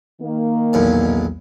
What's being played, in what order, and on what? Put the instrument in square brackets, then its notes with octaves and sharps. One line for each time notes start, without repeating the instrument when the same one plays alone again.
[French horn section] D#3 A#3
[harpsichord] B1 E2 A#2